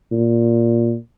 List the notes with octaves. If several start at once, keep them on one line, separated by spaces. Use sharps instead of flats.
A#2